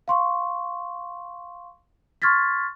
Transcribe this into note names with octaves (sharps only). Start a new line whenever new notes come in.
F5 C6 C#6
C6 C#6 F6 G#6 A6 B6